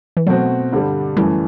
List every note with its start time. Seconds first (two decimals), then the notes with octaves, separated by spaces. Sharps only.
0.17 E3
0.27 B2 F#3 A3 C4 F#4
0.72 G2 D3 G3
1.17 F#2 E3 G3 A3